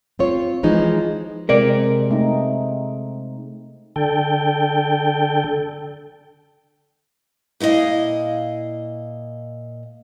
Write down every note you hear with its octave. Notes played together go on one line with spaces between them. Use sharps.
C4 F4 C#5
E3 F3 G#3 D#4
C3 G#3 C4 A#4 D5
A3 C4 D#4
D3 A4 G5
A#2 E4 A#4 D#5 F5